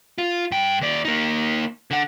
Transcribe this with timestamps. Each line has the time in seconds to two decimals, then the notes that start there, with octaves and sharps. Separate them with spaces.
0.18 F4
0.51 G2 G5
0.81 D#2 D5
1.05 A#3 D#4
1.91 D3 F#5